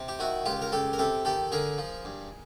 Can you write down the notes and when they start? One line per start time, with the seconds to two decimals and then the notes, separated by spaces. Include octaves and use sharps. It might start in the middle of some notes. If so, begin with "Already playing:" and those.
Already playing: C3
0.08 G4
0.19 D#3 E4 F#4
0.46 C#2 F4 G4
0.62 A#4
0.72 C#2 G4 A4
0.93 A#4
0.98 C3 G4 A4
1.25 D#3 G4 A4
1.52 D3 G#4 A#4
1.78 F3
2.05 G2